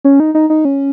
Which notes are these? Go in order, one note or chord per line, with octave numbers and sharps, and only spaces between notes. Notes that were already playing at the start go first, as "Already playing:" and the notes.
C#4
D#4
D#4
D#4
C#4